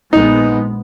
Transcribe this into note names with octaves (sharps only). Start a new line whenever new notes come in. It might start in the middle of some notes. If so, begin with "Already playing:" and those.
A#1 G#3 B3 D#4